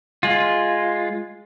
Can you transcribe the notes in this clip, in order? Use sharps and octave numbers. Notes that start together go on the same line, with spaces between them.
G#3 F4